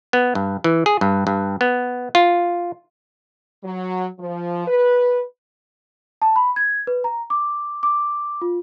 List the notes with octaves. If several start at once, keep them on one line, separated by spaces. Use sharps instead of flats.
B3
G2
E3
G#4
G2
G2
B3
F4
F#3
F3
B4
A5
B5
G#6
B4
A#5
D6
D6
F4